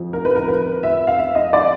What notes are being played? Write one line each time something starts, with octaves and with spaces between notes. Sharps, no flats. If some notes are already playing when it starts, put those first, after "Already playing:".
Already playing: F2 F3
A#4
B4
A#4
B4
E5
F5
E5
D#5
D5